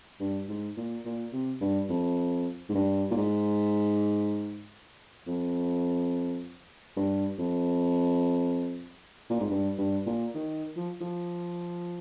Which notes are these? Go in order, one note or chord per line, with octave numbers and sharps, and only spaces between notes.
G2
G#2
A#2
A#2
C3
G2
F2
G#2
G2
A#2
G#2
F2
G2
F2
A#2
G#2
G2
G2
A#2
D#3
F3
F3